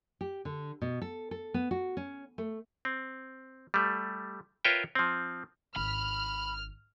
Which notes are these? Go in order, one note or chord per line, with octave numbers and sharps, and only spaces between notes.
G4
D3
B2
A4
A4
B3
F#4
C#4
A3
C4
G3 A3
F4 A#4 B4 C#5 E5 G5
F3 C4
G#1 B5 F6